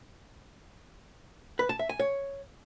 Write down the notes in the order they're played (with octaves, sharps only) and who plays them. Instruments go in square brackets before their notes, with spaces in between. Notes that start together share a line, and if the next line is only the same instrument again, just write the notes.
[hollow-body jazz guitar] B4
A5
E5
G#5
C#5